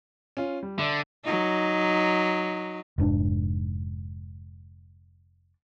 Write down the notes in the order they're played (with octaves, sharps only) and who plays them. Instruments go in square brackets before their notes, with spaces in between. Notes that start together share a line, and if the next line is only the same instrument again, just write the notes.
[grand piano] C#4 F4
G3
[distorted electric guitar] D3 [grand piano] D5 E5
[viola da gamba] F#3 D#4
[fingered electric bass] F1 G#2 D4